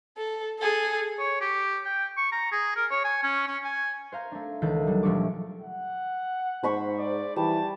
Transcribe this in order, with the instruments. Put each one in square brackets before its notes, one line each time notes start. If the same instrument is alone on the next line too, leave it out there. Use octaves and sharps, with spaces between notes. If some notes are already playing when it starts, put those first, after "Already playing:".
[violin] A4
G#4 A4
[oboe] C#5
G4
G5
C#6
A#5
G#4
A#4
C#5
G#5
C#4
C#4
G#5
[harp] C5 F5 A#5 G6
A3 D4
C#2 D#3 E3 A4 G6
E3 F#3 G3
D#1 F3 A3 D4 C#6 D6
[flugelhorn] F#5
[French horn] G#2 [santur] C5 B5 C#6
[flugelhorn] D5
[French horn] E3 [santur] G3 [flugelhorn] A5